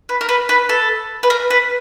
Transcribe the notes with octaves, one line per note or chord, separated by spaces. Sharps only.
B4
A#4
B4
B4
A4
B4
A#4
B4